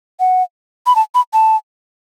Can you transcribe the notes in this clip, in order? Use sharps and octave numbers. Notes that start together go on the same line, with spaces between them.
F#5
B5
A5
B5
A5